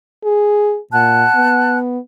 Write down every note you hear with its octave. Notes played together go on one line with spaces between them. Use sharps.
G#4
A#2 F#5 A5 F#6
B3